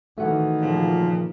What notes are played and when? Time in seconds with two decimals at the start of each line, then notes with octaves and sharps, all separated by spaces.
0.18 D#3 E3 A3 F#4 F#5
0.61 A#2 C#3 F3